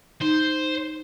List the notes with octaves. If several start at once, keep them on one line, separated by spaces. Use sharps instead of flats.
D#4 C5